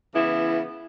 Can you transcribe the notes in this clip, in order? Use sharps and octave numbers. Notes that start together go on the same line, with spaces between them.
C#3 E3 B3 E4